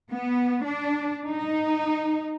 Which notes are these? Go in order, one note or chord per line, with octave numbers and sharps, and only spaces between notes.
B3
D4
D#4